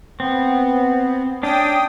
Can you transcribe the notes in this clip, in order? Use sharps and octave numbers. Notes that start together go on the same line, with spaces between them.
B3 C4
C#4 D4 G5 D#6